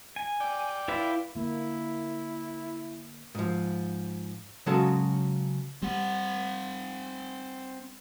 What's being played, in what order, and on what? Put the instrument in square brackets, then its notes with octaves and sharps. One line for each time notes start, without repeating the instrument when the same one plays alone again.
[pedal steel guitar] G#5
[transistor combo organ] D5 G5
[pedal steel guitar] E4 F4 B4
[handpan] D3 A#3 [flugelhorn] E4
[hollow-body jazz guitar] G#2 F3
C#3 F#3 G#3 C#4 F#4 A4
[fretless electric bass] G3 [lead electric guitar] C4 F#5